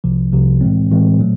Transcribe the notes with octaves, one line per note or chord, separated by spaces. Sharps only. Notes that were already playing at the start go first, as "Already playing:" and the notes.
C2 C3 F3
C2 C3 F3
A2 E3 G#3 C4
A2 E3 G#3 C4
A#2 F#3 A3